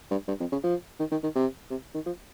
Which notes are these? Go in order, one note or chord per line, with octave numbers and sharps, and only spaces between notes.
G2
G2
F2
C#3
F3
D#3
D#3
D#3
C3
C3
D#3
F3